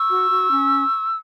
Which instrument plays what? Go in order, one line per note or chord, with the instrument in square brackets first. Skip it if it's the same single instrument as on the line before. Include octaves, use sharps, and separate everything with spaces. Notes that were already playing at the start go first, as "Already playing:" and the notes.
Already playing: [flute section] C#6 E6
F#4
F#4
C#4